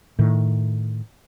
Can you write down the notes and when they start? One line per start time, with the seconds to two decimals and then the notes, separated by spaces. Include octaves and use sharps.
0.19 A2 D#3